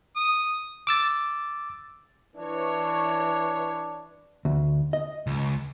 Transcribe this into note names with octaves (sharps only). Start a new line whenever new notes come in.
D#6
D6 E6 A6
E3 D4 C#5
D2
D#5
C#2